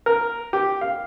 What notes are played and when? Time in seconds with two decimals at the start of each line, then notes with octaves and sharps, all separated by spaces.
0.06 A#4
0.53 G4
0.81 F5